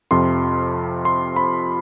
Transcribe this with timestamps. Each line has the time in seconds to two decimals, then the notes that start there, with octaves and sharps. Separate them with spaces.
0.11 F2 C3 F3 C6
1.05 C6
1.36 B5